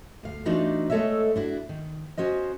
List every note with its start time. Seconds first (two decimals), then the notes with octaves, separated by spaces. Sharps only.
0.23 D2 F5
0.45 E3 A3 D4 D#4 F4 F#4
0.90 G#3 A3 A4 C#5 D#5 E5
1.36 D4 E4 F#4
1.69 D#3
2.18 C#4 F#4 C5 D#5